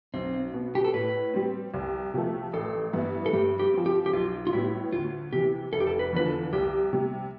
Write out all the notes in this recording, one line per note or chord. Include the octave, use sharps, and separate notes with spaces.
B1 C4
B2 B3
G4
A4
A2 B4
G3 C4
C2
C3 F3 A3
A1 A4
G2 E3 B3 E4
A4
G2 G4
G4
F3 C4
G4
G4
B1 F4
F4
A2 G3 B3 E4
D2 F4
C3 E3 G4
F1 A4
G4
A4
B4
E2 D3 F3 B4
A4
C2 G4
C3 G3